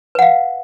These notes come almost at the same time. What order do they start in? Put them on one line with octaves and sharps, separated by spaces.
B4 F#5 F5